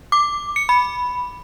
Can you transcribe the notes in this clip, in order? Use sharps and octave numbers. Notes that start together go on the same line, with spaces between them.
D6
C#7
B5